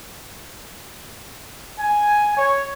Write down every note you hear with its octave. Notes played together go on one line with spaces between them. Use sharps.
G#5
C#5